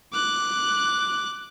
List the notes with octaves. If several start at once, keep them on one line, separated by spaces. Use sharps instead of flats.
D6 F#6